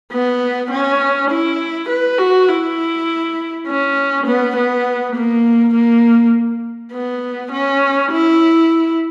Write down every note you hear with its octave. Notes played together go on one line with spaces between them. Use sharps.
B3
C#4
E4
B4
F#4
E4
C#4
B3
B3
A#3
A#3
B3
C#4
E4